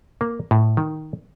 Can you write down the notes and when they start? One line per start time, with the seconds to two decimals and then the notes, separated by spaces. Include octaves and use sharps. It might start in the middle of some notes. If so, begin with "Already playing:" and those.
0.21 A#3
0.51 A2
0.77 D#3